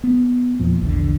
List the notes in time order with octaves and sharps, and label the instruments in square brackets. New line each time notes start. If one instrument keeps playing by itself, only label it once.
[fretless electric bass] B3
E2 A#2 F3
A#1 E2 D3